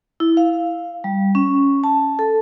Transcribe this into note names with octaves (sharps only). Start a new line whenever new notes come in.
E4
F5
G3
C#4
A5
A4